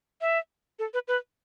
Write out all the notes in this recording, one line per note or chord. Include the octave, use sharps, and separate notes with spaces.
E5
A4
B4
B4